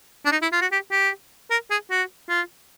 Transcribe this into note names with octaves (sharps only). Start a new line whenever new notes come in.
D4
D#4
E4
F4
F#4
G4
G4
A#4
G#4
F#4
F4